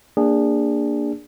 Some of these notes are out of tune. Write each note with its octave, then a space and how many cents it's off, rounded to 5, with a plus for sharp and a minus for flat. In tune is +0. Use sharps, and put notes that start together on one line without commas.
A#3 +0 D4 +0 G#4 -25